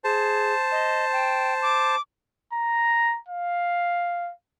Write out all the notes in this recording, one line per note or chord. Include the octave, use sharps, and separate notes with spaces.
G#4 C5 A5
D#5
G5
D6
A#5
F5